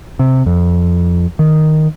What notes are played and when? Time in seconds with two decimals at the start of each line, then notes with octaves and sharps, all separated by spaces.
0.19 C3
0.46 F2
1.39 D#3